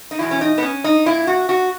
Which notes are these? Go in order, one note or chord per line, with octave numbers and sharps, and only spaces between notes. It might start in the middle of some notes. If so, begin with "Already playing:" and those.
D#4
E2 B2 E4
C#4
D#4
B3
C#4
D#4
A#2 E4
F#4
F#4